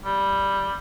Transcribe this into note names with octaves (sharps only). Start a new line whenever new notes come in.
G3